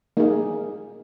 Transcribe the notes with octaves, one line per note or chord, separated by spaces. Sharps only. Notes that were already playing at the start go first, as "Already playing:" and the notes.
A#3 D#4 G#4